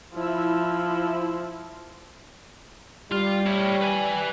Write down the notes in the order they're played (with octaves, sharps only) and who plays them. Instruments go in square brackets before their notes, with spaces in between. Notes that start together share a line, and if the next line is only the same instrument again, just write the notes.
[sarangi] F3 [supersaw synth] E4 E6
[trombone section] G3 [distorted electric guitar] F4
[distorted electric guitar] E4 C#5
B4 G#5